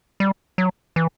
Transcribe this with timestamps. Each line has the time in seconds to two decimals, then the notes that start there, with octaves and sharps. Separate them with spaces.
0.20 G3
0.58 F#3
0.96 E3